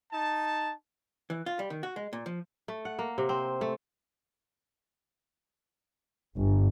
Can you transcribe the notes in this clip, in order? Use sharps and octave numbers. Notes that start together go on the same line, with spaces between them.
D#4 A5
E3
F4
G3
D#3
F#4
G#3
A#2
F3
A3
F#5
A#3
C3
C4
A3
G1